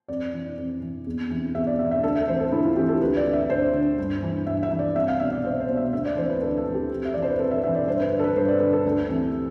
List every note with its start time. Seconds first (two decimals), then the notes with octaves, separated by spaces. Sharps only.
0.08 F2 D5
0.33 E3
0.57 F2
0.82 E3
1.06 E2
1.30 C3 E3
1.55 E2 E5
1.67 D5
1.79 C3 E5
1.83 E3
1.91 E5
2.03 D2 A4
2.15 E5
2.28 C3 E3 C5
2.40 A4
2.52 D2 E4
2.64 F4
2.76 C3 G4
2.79 E3
2.88 A4
3.01 D2 B4
3.17 D5
3.25 D3
3.33 E5
3.49 D2 C5
3.74 D3
3.98 G2
4.23 E3
4.47 G2 E5
4.63 E5
4.71 E3
4.79 D5
4.96 C2 E5
5.08 F5
5.20 B2 E5
5.32 D5
5.44 C2 C5
5.60 C5
5.69 B2
5.77 E5
5.93 D2 E5
6.05 D5
6.17 C3 E3 C5
6.30 B4
6.42 D2 A4
6.57 A4
6.66 C3 E3
6.74 G4
6.90 F2
7.05 E5
7.14 C3 E3 D5
7.22 C5
7.30 B4
7.39 F2 A4
7.51 E5
7.63 C3 E5
7.68 E3
7.75 D5
7.87 G2 C5
8.00 B4
8.12 D3
8.19 A4
8.24 B4
8.36 G2 C5
8.48 D5
8.60 D3 B4
8.73 A4
8.85 D2
9.09 C3 E3